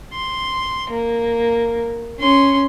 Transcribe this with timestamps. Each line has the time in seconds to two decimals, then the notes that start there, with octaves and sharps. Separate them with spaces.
0.13 C6
0.90 A#3
2.19 C#4 C6